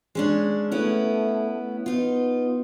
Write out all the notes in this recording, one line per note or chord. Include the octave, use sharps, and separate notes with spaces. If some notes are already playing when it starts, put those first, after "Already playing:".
G#3 C#4 D4
A3 B3 C#4 E4
B3 D#4 F4